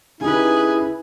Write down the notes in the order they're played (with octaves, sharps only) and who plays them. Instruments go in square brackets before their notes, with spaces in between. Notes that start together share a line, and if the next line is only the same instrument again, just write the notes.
[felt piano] C#3 D#4 G4 [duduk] E4 [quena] G#4 [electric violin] B4 G#5